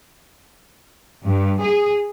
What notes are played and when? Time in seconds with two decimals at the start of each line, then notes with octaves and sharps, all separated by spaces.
1.26 G2
1.63 G#4